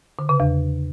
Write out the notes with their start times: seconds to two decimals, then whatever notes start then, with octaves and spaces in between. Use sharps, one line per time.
0.19 D3
0.29 C#3
0.40 E2